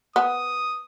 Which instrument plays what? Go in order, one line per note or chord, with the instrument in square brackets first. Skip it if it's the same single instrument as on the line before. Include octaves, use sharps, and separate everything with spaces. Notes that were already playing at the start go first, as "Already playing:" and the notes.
[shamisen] B3 [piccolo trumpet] D#6